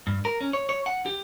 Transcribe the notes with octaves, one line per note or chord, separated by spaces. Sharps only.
G2
A#4
C#4
C#5
C#5
F#5
G4